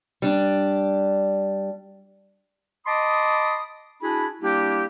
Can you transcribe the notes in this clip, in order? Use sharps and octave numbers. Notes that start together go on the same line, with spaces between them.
G3 D4
D#5 A5 B5 C6 D6 D#6
D4 E4 F#4 G#4 G#5 B5
G3 A#3 D4 E4 G4